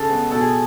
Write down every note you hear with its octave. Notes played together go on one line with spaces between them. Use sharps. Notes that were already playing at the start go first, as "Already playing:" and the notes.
Already playing: C#3 A4
G#3 B3
B2 A4
G#4